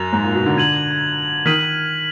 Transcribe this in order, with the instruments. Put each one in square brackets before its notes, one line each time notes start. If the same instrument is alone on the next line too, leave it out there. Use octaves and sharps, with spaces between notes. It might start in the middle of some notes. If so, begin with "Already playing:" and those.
Already playing: [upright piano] F#2 [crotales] F#6 A#6 F7
[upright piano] G#2
A#2
B2
D3
[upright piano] D3 [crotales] G#6 D#7 F#7
[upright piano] D#3 [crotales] F6 B6 D#7 F#7